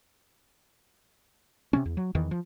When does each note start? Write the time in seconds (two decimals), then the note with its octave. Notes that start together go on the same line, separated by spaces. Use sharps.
1.73 C3 G3 C#4
1.85 E2
1.97 F#3
2.15 E2 D#3 E3
2.31 F3